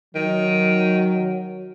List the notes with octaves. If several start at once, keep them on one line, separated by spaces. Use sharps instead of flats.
D#3 F#3